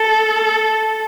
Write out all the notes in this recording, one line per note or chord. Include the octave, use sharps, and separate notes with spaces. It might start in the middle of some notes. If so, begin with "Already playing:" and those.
Already playing: A4